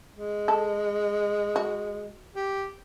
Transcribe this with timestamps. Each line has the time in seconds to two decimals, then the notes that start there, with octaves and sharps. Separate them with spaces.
0.16 G#3
0.48 A4
1.56 F#4
2.35 G4